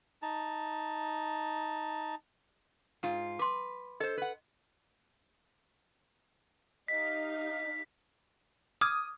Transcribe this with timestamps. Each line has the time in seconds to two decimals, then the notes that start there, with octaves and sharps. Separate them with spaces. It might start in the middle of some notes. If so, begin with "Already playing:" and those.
0.22 D#4 A5
3.03 G#2 F4
3.39 B4 C6 D6
4.00 A4 C5 D#5
4.18 B4 F#5
6.88 D#4 G4 D#5 F5 B6
8.81 D6 D#6 F6 G#6